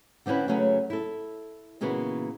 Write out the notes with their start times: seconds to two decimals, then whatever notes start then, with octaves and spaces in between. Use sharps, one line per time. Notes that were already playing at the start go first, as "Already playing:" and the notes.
0.26 D3 C4 C#4 E4 B4
0.48 C#3 F#3 A3 C#4 B4
0.90 E4 A4
1.81 A#2 C#3 E3 A#3 B3 F#4